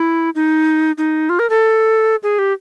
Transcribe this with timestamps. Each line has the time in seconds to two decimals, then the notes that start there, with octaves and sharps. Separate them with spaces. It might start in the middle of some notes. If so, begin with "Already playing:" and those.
Already playing: E4
0.35 D#4
0.98 D#4
1.29 F4
1.39 A#4
1.50 A4
2.23 G#4
2.39 G4